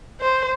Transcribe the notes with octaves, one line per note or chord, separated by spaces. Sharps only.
C5